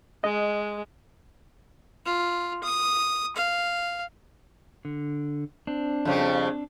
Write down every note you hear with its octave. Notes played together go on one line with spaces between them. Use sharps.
G#3 D#5
F4
D#6
F5
D3
C4 D4
F2 C#3 G3